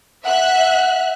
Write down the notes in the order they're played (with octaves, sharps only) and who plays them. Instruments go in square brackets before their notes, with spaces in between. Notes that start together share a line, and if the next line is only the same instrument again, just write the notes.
[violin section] E5 F#6 [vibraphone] F#5